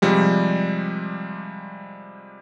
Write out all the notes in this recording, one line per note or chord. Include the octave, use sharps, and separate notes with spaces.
C3 F3 G3 G#3